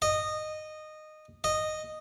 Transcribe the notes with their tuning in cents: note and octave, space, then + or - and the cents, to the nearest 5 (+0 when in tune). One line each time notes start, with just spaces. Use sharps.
D#5 -15
D#5 -10